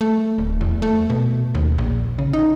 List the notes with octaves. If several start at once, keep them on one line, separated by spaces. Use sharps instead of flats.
A3
D1
E2
A3
B2
D#2
A#1
C#3
D#4